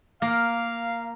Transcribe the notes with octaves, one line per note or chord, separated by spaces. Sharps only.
A#3 F5